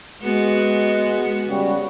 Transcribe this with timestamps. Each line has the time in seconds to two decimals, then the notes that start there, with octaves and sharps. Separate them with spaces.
0.22 G#3 B3 F#4
1.48 C#3 G3 F#4